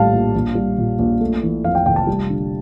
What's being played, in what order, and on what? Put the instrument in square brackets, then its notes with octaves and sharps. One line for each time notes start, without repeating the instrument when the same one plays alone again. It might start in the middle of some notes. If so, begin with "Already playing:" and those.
Already playing: [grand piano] A#1 A2 G3 F5 A5
A#1
A#1
G3
A#2
A#1
A3
E3
F2 F5
G5
F1 G5
A5
G3
D3